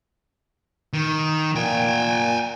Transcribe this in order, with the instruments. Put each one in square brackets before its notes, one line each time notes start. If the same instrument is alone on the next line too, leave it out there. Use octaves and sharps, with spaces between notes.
[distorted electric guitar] D#3
[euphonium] A#2 [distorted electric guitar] G5 G#5